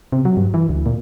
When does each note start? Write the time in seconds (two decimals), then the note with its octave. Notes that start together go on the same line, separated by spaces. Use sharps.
0.12 C3
0.25 F#3
0.37 G2
0.54 E3
0.69 D2
0.86 A#2